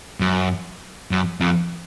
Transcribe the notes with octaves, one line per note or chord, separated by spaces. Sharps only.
F#2
F#2
F2